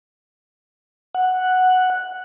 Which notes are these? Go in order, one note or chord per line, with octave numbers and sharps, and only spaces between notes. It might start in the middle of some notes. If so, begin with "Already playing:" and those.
F#5